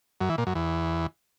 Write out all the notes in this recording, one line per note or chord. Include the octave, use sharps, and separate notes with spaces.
F#2
E3
A#2
F#2
E2